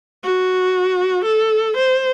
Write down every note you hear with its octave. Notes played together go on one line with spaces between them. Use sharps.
F#4
A4
C5